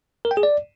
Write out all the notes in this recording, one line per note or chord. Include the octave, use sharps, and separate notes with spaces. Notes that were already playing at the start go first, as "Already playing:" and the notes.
A#4
G5
G#4
D5